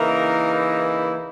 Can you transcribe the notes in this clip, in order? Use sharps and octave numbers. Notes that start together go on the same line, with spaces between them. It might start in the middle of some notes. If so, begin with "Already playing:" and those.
Already playing: C#3 E3 A#3 D#4 A#4
E4